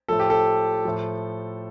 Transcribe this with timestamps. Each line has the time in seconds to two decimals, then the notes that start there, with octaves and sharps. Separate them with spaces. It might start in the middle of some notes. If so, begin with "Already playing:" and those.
0.08 A2 F3 A4
0.20 G4
0.30 A4
0.85 A2 F3